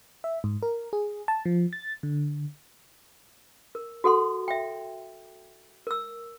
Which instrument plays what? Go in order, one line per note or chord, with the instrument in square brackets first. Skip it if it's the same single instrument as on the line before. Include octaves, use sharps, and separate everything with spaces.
[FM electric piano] E5
G#2
A#4
G#4
A5
F3
A6
D3
[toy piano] A#4
F#4 A4 F#5 C6
E5 G5
A#4 E6